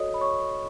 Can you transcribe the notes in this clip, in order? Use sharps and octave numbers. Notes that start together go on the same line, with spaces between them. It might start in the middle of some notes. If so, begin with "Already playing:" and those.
Already playing: F#4 A4 C#5 D#5 D#6
B5
C#5 C#6